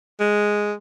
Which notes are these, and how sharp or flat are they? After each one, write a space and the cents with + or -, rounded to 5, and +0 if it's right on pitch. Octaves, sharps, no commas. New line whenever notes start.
G#3 +0